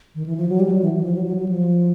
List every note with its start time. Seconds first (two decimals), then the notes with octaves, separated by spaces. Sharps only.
0.15 D#3
0.26 E3
0.37 F3
0.49 F#3
0.60 G3
0.71 F#3
0.82 E3
0.97 E3
1.03 F3
1.15 F#3
1.25 F#3
1.37 F#3
1.48 F3